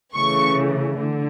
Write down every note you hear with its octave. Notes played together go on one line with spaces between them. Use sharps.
C#3 E3 A3 C#6
D3